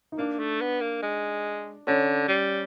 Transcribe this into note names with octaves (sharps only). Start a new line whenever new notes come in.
D#4
A#3 D4
A3
B3
A#3
G#3
D3 C#4
G3